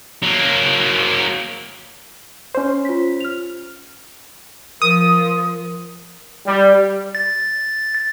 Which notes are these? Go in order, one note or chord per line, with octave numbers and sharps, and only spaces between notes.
F#3 A#3
C#4 C5
F4 B6
F6 F7
F3 A#4 D#6
G3
A6